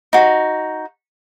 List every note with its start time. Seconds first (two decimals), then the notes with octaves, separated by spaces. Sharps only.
0.13 D#4 F#4